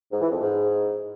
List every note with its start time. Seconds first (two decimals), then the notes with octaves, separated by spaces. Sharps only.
0.12 G#2
0.21 E3
0.30 F2
0.40 G#2